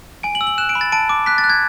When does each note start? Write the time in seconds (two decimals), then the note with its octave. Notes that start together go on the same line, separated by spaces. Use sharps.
0.23 G#5 D7
0.35 F#7
0.41 E6
0.47 F#7
0.58 F#6 E7
0.69 D7
0.75 B5
0.81 A6
0.92 A5 D7
1.09 D6
1.26 F#6 B6
1.38 A6
1.44 F#6
1.50 G#6